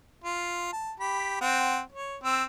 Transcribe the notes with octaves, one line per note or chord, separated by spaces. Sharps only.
F4
A5
G4 B5
C4 F#5
C#5
C4 E6